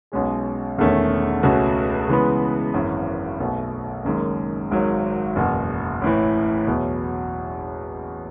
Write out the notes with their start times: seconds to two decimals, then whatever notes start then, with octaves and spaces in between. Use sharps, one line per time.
0.12 B1 B2 G#3 C#4 G#4
0.77 E1 E2 D#3 A3 C#4
1.43 C#2 B2 A3 C#4 F#4
2.08 C#3 E3 G#3 B3
2.74 G#1 F#2 E3
3.40 B1 B2 A3
4.05 F#1 F#2 D#3 G#3
4.71 G#1 G#2 D#3 F#3
5.36 F#1 E2 B2
6.01 A1 A2 E3
6.67 E2 B2 F#3